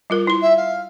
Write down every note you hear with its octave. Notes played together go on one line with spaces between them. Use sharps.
G3 F4 A#4
E4 C6
E5
F5